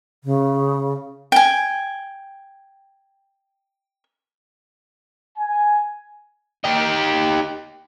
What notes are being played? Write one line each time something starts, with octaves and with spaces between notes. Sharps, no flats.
C#3
G5 G#5
G#5
D#4 G4